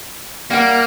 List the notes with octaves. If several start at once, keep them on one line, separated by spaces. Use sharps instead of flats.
G3 A#3 F#5